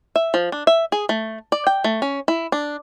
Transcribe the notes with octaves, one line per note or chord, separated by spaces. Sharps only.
E5
F3
D4
E5
G#4
A3
D5
G5
A3
C#4
E4
D4